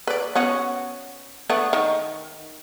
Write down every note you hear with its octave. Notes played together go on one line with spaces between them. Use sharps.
B4 D5
B3 C#4 F#4
A3 B3 D4
D#3